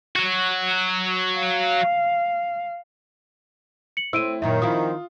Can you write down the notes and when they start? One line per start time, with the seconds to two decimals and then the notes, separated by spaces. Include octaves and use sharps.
0.16 F#3 F#4
1.36 F5
3.97 C#7 F#7
4.13 A3 C4 E4 E6 D7 D#7
4.42 F#2 A#2 D#3 F#3 E5
4.62 F3 C4 E4 F4 D#6